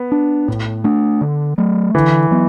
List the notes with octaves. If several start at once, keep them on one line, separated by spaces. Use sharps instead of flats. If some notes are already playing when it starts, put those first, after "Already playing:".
Already playing: B3
D4
A2
A3 D4
D3
F#3 A3
D3 E3
F#3 B3